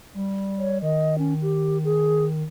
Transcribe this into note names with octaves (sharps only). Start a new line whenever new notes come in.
G3
C#5
D#3 D#5
C#4
G4
G#4